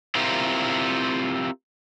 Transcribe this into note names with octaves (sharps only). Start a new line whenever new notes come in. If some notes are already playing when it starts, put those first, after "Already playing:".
C4 E4 F4 G4 A#4